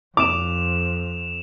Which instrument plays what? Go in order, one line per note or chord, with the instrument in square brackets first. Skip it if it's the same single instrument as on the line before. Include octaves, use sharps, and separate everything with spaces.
[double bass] F2 [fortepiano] D6 [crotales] E7 F7